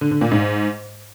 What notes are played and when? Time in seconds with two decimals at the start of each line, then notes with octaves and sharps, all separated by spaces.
0.01 D3
0.11 D3
0.21 A#2
0.31 G#2